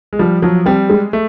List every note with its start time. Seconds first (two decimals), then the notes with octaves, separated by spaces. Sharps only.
0.13 G#3
0.19 F3 G3
0.42 F3 F#3
0.66 G3 C4
0.90 G#3
1.13 A3